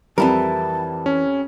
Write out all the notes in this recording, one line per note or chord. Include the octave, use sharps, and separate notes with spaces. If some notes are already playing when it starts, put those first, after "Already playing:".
F2 E3 G3 E4 A#4 A5
C#4